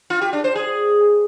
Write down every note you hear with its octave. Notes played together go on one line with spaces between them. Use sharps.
F4
G4
D4
C5
G#4